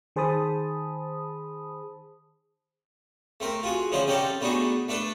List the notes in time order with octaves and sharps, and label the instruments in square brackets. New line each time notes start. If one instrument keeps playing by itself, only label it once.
[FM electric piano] D#3 G#4 C5 A5 B5 D#6
[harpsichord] A3 C4 A#4
F4 F#4 G#4
D3 F3 C#4 E4 G#4 C5
C4 C#4 D#4 G4 A4 D5
A3 B3 D4 D#4 F#4 G#4
A3 D4 A4 B4